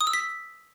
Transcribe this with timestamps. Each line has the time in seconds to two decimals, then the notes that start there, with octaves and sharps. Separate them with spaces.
0.01 D#6
0.07 E6
0.13 B6